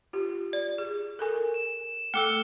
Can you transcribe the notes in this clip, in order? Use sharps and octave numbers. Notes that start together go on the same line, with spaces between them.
F4 G4
D5
G#4
A4 A#4 G#5
E7
A3 A4 G5 D6 E6 C#7 G7